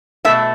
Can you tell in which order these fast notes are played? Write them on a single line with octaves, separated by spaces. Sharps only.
A3 E5 B2